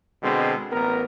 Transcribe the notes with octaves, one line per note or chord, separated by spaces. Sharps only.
B2 D3 G#3 C4
A1 B3 A#4